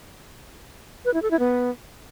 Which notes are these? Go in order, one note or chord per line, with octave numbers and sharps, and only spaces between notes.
B4
E4
A4
E4
B3